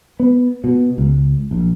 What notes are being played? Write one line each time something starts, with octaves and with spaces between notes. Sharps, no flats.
B3
B2
C#2
A#1